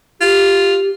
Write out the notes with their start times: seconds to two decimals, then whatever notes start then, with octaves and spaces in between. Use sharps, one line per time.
0.21 F4 G4